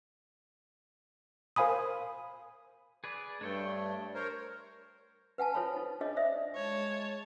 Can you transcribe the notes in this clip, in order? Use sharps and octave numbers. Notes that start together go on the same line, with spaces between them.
A#4 C5 F5 G#5 B5 D#6
G#4 B4 D5
G2 A3 D4 C#5 G5
A#4 C5 C#5
B4 F#5 G#5 A5
E4 F4 A4 C5 C#5 B5
D#4
D4 G#4 C#5 D#5
C5 D5 E5 D#6
G#3 C#5 A5